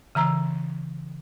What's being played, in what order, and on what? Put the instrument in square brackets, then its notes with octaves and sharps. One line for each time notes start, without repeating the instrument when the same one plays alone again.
[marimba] C#3 E3 A#5 E6